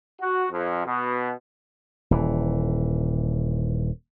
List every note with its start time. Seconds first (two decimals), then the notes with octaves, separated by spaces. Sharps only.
0.20 F#4
0.51 F2
0.86 B2
2.11 D#1 E3